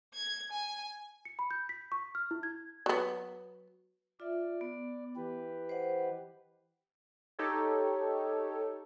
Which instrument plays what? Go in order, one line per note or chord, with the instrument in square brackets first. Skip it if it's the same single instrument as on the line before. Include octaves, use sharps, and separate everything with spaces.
[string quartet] G#6
G#5
[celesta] C#7
B5
G6
B6
C#6
F6
E4
G#6
[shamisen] F#3 B3
[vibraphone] F4 E5 [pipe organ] D5
[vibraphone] B3
[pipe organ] E3 G4 B4
[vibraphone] C5 D#5 F#5
[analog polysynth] D#4 G4 A4 C#5